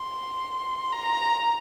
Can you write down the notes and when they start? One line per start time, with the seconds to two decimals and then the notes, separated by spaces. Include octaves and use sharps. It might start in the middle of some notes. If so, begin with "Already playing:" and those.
Already playing: C6
0.93 A#5